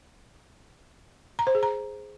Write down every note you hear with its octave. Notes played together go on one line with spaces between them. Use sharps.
A#5
C5
G#4
A#5